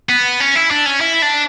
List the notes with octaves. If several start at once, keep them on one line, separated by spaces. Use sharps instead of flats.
B3
C#4
E4
D4
C#4
E4
D4